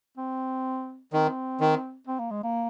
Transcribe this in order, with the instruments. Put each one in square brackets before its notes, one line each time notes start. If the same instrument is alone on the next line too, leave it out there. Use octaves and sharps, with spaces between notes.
[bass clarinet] C4
[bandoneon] D#3 [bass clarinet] C4
[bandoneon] D#3
[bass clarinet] C4
A#3
G#3
A#3